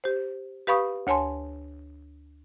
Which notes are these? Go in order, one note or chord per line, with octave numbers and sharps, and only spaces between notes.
G4 C5
G4 B4 F5 B5 C#6 D#6
D2 C#5 G#5 A5 C6